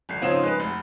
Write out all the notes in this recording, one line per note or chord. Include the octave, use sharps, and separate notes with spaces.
G#1 C7
C#3 F3 C4 D#4 C#5 E7
G#3 B4
F1